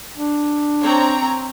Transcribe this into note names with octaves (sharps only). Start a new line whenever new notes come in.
D4
C4 C#5 A#5